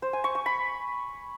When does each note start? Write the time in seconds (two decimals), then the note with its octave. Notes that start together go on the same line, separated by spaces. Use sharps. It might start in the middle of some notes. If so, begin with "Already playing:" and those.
0.02 C5
0.13 G#5
0.24 C#6
0.35 C#6
0.46 B5